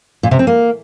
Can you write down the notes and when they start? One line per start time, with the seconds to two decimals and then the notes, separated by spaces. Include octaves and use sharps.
0.23 A#2
0.31 C3
0.39 C4
0.47 A#3